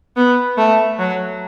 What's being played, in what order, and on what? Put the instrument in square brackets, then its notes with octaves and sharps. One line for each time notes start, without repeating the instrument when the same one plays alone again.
[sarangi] B3
A3
F#3